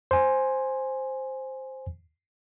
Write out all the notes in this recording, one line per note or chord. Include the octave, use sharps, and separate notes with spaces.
C5 G#5